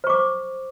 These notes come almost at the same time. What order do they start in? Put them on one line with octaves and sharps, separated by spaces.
C5 C#6 D6